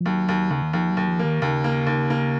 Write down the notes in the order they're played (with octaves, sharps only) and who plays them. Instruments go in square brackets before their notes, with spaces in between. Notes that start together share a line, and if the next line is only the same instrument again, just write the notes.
[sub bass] F3
[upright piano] D#2 [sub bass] F#3
[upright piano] D#2
[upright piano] D#2 [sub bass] C#3
[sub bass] D#3
[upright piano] D#2 [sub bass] F3
[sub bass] F#3
[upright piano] D#2
[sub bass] F3
[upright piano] A#3
[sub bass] D#3
[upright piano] D#2 [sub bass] C#3
[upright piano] A#3
D#2
A#3